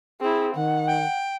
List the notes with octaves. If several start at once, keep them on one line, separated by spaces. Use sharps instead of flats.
C4 E4 G#4
D#3 F#5
G5